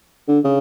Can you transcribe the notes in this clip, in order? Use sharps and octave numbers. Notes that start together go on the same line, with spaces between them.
D3
C#3